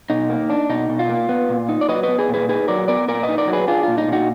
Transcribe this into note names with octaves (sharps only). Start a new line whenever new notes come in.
B2 D#4
A#3
D4
B2 D#4
B2
F4
A#3
B3
A#2
D#4
D5
F#3 B4 D#5
B4 D#5
B3
G#4 B4
A#2
G#4 B4
D#4 G#4 B4
F#3 A#4 D5
B3 A#4 D5
A#2 A#4 D5
B4 D#5
D#4
A#4 D5
F#3
G#4 B4
D4 F4 G#4
A#2 F4
D#4
A#2
D#4 F#4